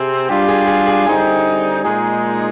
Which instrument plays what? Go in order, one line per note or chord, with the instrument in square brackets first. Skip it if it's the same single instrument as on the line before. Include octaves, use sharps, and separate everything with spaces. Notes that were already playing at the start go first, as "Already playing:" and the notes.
Already playing: [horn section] C3 C4 [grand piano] G#4
[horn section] G3 D4 F4 [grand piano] G4
[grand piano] G#4
G#4
G#4
[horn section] D3 G3 C4 D#4 [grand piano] G#4
[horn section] A#2 G#3 D#4 [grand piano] G#4